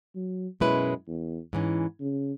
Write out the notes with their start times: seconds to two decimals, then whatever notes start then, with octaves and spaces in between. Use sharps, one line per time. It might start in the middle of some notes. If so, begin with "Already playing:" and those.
0.15 F#3
0.60 F#2 B2 G#3 C#4 E4 B4
1.07 E2
1.53 G#2 E3 C#4
2.00 C#3